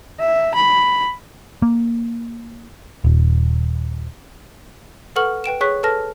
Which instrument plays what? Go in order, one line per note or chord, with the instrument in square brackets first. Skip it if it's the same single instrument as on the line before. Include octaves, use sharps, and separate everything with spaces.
[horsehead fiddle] E5
B5
[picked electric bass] A#3
D#1
[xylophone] A4 B4 F#5 C#6 F6 F#7
B4 G5 D7 E7
G#4 C#5 C#6 F#6 B6
A4 B4 A5 F6 A#6